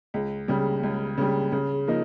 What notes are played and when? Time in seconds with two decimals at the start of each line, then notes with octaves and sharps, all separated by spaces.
0.14 C#2
0.48 C#3 G3
0.83 C#2
1.18 C#3 G3
1.52 C#3
1.88 F3 A#3 D#4